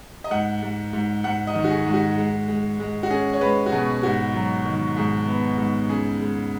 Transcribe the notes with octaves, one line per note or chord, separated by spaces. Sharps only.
D#5
G#2 F#5
G#2
G#2
G#2 F#5
D#5
D#3
F#4
G#4
G#2
F#4
G#3
G#3
G#3
F#4
C#4 G#4
C#5
G#3 B4
F#4
B2 G#4
G#2 F#4
F#3
D#3
G#2 G#4
B3
G#2
C#3 G#4
G#3